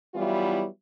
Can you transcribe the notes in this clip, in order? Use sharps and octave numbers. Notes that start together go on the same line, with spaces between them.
E3 F#3 G3 B3 E4 F4